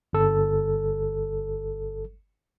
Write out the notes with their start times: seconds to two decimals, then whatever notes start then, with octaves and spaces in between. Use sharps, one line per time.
0.13 G1 A4